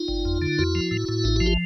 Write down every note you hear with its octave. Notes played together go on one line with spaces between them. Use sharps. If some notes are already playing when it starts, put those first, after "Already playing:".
Already playing: D#4 F4
G1
F2
D3
F2 E4 F#4
F3
A2
A2
A1 D#4 F4
F3 E4 F#4
F4 G4